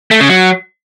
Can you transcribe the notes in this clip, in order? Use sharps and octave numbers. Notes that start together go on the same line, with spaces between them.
A3
C#3
F#3